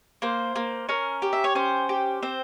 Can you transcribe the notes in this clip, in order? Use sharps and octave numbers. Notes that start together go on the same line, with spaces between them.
A#3 C5
A#3
C#4 A#4
G4
E5
C#5
C#4 C5
G4
C4 C5